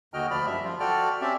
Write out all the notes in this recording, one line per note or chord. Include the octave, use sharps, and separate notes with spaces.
D#2 D3 F#4 D#5 G5 F6
D2 F3 D5 B5 F6
F#2 G3 E5
F3 F4
F#4 A4 D5 G5 F6
C4 C#4 G4 D5 E5